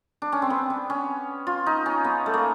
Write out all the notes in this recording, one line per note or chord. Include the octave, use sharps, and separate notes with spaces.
D4
C#4
C4
B3
D4
C#4
F4
D#4
C#4
B3
A3
A#3